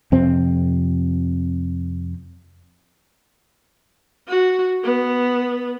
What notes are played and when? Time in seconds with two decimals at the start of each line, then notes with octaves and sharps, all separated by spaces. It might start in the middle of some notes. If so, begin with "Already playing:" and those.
0.12 F2 C3 C4
4.28 F#4
4.84 B3